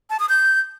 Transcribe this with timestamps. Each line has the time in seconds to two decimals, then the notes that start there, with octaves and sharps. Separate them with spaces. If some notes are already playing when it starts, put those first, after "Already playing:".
0.10 A5
0.20 D#6
0.29 G6